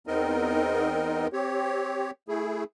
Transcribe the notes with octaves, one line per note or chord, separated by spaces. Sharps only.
E2 B3 C4 D#4 A#4 D#5
C4 G4 C#5
A3 E4 G#4